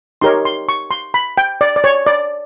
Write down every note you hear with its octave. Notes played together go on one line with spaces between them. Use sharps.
D#4 G4 A#4 C#5 C6
C6
C#6
C6
B5
G5
D5
D5
C#5
D5